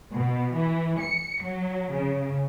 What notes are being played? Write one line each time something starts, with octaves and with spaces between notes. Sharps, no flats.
B2
E3
C#7
F#3
C#3